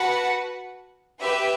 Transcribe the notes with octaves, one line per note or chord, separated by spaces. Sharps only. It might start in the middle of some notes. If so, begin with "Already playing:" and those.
Already playing: F#4 B4 F#5 A5
G4 B4 E5